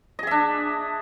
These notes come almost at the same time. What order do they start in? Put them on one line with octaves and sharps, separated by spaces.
D#5 G#4 E5 D4